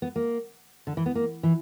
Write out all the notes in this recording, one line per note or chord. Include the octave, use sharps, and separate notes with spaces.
B3
A#3
D3
E3
B3
A#3
E3